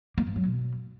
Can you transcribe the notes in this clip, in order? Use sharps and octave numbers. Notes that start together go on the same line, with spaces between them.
A#3
G2
F#3
B2